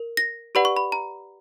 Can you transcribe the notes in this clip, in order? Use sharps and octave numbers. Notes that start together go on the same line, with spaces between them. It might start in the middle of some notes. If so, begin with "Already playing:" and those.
Already playing: A#4
A#6
G4 B4 D5 F#5 B5
C#6
B5
A#5